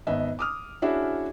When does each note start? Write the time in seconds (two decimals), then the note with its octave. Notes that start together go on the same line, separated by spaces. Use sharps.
0.07 G#1 B3 D#5 E5
0.39 D6 D#6 F6
0.82 C#4 D4 E4 F#4 G#4 E5